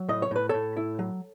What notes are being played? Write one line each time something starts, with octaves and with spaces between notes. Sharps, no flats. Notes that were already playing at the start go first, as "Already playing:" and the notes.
Already playing: F#3
A2 D#5
C#5
A2 B4
A2 A4 C#5
E4
F#3